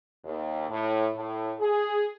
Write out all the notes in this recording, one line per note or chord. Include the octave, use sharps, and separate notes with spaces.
D#2
A2
A2
G#4